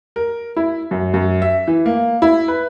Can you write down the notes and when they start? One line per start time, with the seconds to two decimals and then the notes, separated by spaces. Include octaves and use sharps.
0.16 A#4
0.56 E4
0.91 F#2
1.14 F#2
1.42 E5
1.68 E3
1.86 A#3
2.22 E4
2.48 B4